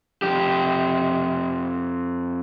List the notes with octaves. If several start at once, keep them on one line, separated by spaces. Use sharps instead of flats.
F2 G4